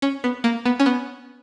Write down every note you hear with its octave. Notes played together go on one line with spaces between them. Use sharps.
C#4
B3
A#3
B3
C#4
B3